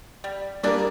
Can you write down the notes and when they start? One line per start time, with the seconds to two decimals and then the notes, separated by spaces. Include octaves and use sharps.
0.24 G3
0.63 G3 A#3 D4 G#4 A#4 D5